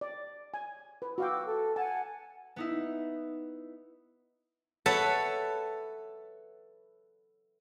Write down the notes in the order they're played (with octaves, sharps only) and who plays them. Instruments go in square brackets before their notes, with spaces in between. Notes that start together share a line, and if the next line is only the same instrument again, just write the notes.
[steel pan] D5
G#5
B4
[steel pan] F#4 F5 G5 [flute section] D6 E6
[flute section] A4
[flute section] F#5 G#5 [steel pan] A5
[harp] B3 D#4 E4
[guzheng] A4 B4 C#5 E5 F#5 A5